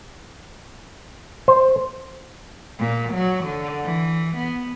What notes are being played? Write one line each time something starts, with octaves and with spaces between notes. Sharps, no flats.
C5
A#2
F#3
D3
E3
B3